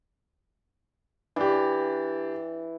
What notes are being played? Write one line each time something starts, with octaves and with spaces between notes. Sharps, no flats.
E3 D4 G4